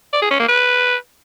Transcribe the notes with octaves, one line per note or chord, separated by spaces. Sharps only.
D5
G#4
C#4
A#3
B4